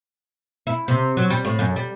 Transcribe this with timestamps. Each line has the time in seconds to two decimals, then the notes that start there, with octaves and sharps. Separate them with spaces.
0.67 E4
0.88 C3
1.17 F#3
1.30 G3
1.45 A2
1.59 F#2
1.76 G3